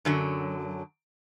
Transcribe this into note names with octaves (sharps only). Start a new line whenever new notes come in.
F#2 D3 F#3